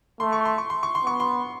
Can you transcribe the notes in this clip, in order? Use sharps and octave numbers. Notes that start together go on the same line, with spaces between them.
A3 C6
C#6
C6
C#6
C6
C#6
C6
B3 C#6
C6